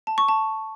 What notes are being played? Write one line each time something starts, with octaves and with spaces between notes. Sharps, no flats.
A5
C#6
A5